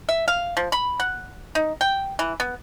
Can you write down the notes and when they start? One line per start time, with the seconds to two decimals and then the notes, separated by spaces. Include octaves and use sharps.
0.09 E5
0.28 F5
0.57 F3
0.72 B5
1.00 F#5
1.55 D#4
1.81 G5
2.19 E3
2.40 B3